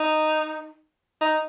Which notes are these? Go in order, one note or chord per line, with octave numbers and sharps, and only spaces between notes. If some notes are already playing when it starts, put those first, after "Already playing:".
Already playing: D#4
D#4